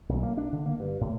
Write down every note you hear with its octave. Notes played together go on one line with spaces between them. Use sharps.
B1
A#3
D4
D3
A#3
G2
A2